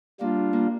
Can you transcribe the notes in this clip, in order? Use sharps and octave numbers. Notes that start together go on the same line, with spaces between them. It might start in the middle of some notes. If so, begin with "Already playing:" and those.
G3 A#3 D4 F4
A#3